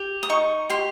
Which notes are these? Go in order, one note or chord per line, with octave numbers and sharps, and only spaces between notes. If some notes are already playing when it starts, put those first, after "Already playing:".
Already playing: G4
D#6
D#4 C#6
G4 C6